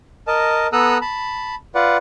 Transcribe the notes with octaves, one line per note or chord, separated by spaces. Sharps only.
A#4 D#5 A5
B3 A4 A#5 D#6 E6 F#6
A5 B5
F4 B4 D5 F#5